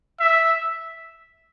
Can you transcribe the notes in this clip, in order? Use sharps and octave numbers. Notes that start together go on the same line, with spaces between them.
E5